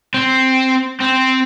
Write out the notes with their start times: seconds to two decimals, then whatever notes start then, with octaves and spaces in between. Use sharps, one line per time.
0.14 C4
1.00 C4